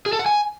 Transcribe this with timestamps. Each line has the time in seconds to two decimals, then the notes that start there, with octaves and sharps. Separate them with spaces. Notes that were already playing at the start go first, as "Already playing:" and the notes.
0.06 G#4
0.13 A4
0.19 F#5
0.26 G#5